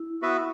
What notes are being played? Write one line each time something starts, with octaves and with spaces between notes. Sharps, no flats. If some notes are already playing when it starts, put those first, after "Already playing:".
Already playing: E4
B3 F#4 B4 E5